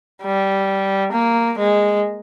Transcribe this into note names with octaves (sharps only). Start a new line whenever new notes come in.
G3
A#3
G#3